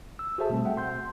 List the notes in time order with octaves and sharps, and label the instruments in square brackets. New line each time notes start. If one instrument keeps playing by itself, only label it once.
[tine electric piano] E6
F#4 G#4 A4 C5 E5 A5
B2 G3 A3 C4
E5 F#5 G5
C6 G6